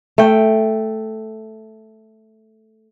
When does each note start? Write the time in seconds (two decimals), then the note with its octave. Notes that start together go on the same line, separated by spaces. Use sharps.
0.18 A3 G5